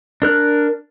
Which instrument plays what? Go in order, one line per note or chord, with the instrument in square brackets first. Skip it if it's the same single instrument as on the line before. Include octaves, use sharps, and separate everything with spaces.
[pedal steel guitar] D4 A#4 F#6